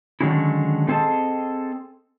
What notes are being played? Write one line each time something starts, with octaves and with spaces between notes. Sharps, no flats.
D3 D#3 F#3 G#3 C#4 E4
A3 C4 G#4 A4 D#5 A5